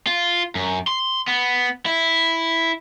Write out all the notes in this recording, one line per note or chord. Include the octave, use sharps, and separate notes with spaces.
F4
F#2
C6
B3
E4